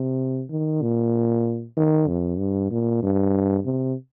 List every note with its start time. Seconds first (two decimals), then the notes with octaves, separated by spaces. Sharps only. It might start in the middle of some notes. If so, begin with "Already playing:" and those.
Already playing: C3
0.50 D#3
0.82 A#2
1.77 D#3
2.08 F2
2.39 G2
2.71 A#2
3.03 G2
3.66 C3